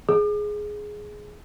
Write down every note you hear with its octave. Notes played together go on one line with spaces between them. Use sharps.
G#4